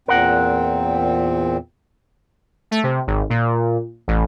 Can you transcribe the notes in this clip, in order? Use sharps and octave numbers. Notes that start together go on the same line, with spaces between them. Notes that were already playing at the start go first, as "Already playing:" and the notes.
E2 A#2 C4 A#4 F#5
A3
C3
G#1
A#2
A1